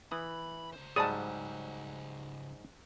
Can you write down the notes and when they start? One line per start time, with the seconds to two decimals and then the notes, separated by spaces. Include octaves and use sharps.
0.12 E3 B5 D#6
0.73 C#2 C5
0.96 G#2 F#3 G3 G#4 D5 A5 B5 D#6